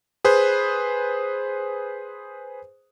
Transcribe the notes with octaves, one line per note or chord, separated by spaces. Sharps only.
G#4 B4 C5